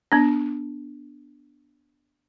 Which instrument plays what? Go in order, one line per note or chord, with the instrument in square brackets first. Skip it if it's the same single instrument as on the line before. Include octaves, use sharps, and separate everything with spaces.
[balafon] B3 D4